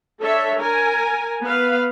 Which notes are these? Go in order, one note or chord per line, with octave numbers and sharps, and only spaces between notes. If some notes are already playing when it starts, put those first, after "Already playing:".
D4 A4 C#5 E5
A#4 G#5
B3 B4 F5